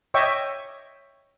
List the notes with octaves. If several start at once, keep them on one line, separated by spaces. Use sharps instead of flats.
C#5 D#5 E5 G5 C#6 D6